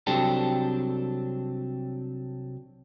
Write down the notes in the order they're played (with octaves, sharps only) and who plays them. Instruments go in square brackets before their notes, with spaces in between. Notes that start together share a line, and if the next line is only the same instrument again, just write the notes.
[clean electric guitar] C2 F#3 C4 D4 G4 A4